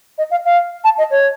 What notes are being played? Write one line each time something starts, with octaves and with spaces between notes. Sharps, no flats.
D#5
F5
F5
A5
D#5
C#5